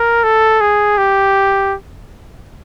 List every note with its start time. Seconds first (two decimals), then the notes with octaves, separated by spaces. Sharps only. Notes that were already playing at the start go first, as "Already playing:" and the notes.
Already playing: A#4
0.24 A4
0.61 G#4
0.98 G4